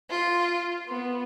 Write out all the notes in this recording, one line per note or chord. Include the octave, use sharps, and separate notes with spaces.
F4
B3